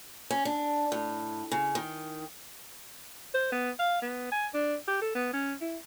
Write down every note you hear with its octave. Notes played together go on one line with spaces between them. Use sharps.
C#4
D4
A2
C#3
D#3
C5
B3
F5
B3
G#5
D4
G4
A4
B3
C#4
E4